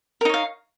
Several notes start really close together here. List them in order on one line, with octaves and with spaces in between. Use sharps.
A#4 D#4 C#5 F5